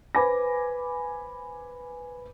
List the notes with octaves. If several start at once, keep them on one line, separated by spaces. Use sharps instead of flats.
B4 C5 G#5 B5 D6 A#6